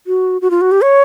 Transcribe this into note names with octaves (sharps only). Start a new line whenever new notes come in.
F#4
F#4
F4
F#4
G4
C#5